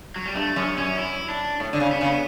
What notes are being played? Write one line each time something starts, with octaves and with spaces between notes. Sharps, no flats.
F#3
G3
G2 A3
F#2 C#4
F#2 C#4
E4
D4
A2
D3
C#3
B3
C#3